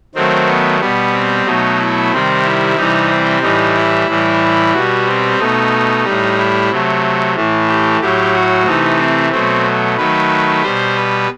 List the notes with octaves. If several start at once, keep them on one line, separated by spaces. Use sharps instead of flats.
D#3 F#3 A3 C4
B3
B2 G3 B3
C4
B2 F#3 A3 D#4
E4
C3 D#3 G3 C4
E4
C3 E3 G3 D#4
C4
A2 E3 G3 D#4
E4
A2 E3 G3
B2 G3 F#4
C4
B2 A3 D#4
A2 G3
E4
C3 F#3 A3
A2 E3 A3
G4
A2 F#3 A3 G4
F#4
C3 E3 A3 D#4
C4
B2 F#3 A3 C4
D#3 F#3 A3 B4
B2 G3 C5
B4